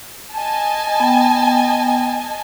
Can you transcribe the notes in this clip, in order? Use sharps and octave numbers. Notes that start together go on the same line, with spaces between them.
D#5 G#5 A5
B3 G5